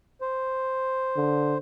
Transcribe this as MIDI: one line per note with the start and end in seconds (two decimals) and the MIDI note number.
0.21 1.58 72
1.16 1.56 50